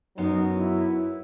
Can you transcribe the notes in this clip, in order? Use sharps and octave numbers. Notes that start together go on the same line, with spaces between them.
F#2 F#3 B3 D#4
E4